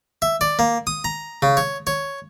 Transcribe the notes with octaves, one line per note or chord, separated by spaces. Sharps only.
E5
D5
A#3
D#6
A#5
C#3
C#5
C#5